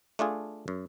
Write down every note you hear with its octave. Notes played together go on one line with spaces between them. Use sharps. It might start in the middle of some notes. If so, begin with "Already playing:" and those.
A3 D4 F4 G#4
F#2